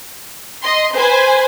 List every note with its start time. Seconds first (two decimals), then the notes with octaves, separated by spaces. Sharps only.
0.63 D#5 C6
0.96 B4 C5 G#5